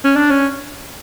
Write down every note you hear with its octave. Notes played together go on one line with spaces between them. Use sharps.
C#4
D4
C#4